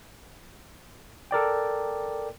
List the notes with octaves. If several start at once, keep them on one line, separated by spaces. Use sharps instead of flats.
A4 A#4 D5 G5